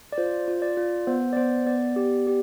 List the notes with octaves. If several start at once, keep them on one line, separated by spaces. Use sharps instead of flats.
D5
F4 C5
F4
D5
F4
B3 C5
D5
B3 C5
B3 D5
G4
G4